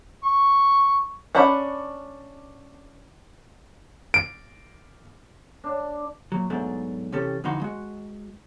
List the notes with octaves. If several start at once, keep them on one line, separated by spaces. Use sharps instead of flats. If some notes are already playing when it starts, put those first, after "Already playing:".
C#6
C#4 D4 F#5 B5
D7
D4
A#2 F#3
G#2 B2 F#3 A3 D4
C3 E3 C#4 G4 A4
F2 D3 E3 D#4 F#4 C6
G#3 F#4